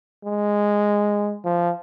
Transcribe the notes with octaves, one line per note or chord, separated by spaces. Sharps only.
G#3
F3